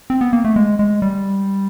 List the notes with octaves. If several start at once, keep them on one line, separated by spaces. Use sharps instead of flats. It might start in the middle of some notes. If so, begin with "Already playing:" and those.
C4
B3
A#3
A3
G#3
G#3
G3